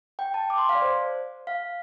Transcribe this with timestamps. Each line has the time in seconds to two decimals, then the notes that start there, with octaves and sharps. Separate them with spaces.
0.19 G5
0.34 A5
0.50 D6
0.58 C6
0.69 F5
0.75 D5
0.82 C5
1.47 F5